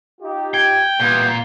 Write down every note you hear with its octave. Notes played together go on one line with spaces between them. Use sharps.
D#4 F4 G4
G5 G#6
A#2 E3 G3 B3 G6